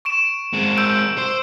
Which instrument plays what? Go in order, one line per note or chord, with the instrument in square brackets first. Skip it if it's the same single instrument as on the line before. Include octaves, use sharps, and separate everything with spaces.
[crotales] C#6 D7 E7
[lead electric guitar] G#3 C4
[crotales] E6 G6 D7
[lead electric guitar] C5